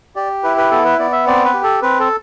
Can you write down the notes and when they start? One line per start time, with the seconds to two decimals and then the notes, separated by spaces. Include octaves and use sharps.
0.16 G4 D5
0.43 E4 B4
0.57 B4
0.71 B3 A4
0.85 B4
0.99 B3 D5
1.12 E5
1.26 C4 D5
1.45 B4
1.53 G4
1.63 A4
1.82 C4 B4
2.00 A4